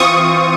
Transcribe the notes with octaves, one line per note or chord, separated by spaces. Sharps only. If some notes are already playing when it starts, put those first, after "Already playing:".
Already playing: E3 C4 F4 C#6 D#6